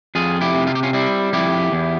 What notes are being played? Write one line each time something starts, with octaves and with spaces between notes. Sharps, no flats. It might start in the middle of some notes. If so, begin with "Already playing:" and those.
F2 F4 G#4
E4 G4
C3
F4
G4
C#4 F4
G3 C4 E4
F2 E4 G4
E2